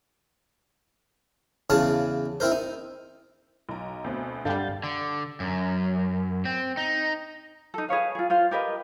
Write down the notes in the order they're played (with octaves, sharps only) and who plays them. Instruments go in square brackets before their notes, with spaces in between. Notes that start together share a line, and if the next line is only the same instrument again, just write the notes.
[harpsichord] E2 C#3 G#4 C#5 F5 A5
C4 E4 A#4 C5
D#4
[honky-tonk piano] B1 A#5
D2 B2 C4
[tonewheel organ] G2 G6 A6 [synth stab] D3 G3 [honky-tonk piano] F5
[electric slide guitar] D3
F#2
C4
D#4
[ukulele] D#4 A4
G#4 B4 C#5 F5
F4 G#4
F4 C5 F5
G4 A#4 B4 D#5